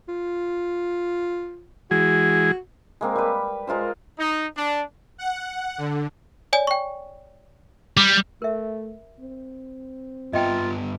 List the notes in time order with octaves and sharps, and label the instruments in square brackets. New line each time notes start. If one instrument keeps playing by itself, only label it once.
[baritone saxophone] F4
[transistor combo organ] E3 G#3 G#4 [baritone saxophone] F#4
[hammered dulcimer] G#3 A#3 C4
G3 B4
G#3 F4 A#4 C5
[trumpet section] D#4
D4
[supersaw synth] F#5
D3
[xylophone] C#5 D5 G#5
G5 C#6
[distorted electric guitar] G3 [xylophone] D6
[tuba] A3 [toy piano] A#4 E5
[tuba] C4
[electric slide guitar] G2 B3 A#5 [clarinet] F4 [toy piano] D#5 E5 G5